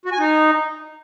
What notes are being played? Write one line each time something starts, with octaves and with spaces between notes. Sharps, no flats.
F#4
G#5
D#4